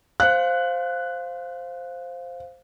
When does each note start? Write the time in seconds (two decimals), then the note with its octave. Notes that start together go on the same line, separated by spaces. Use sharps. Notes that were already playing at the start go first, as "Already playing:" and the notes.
0.20 C5 F5 F#6